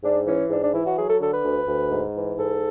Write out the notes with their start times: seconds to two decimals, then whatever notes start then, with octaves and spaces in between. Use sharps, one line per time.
0.03 G#2 D4
0.26 E3 C#4
0.50 G#2 D4
0.62 D4
0.73 E3 E4
0.86 F#4
0.97 F#3 G#4
1.08 A4
1.20 D3 A4
1.33 B4
1.45 D2
1.68 D2
1.91 G#2
2.15 E3
2.38 G#2 A4